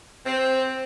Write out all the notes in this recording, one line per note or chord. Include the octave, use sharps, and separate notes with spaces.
C4